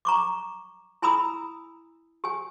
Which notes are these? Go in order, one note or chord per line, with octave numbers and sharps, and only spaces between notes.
A#5 C#6 D6
E4 G#5 A#5 B5 D#6 E6
G4 G#5